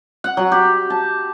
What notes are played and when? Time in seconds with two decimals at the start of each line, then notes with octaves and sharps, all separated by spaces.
0.24 F#5
0.37 F#3
0.52 G4
0.90 A5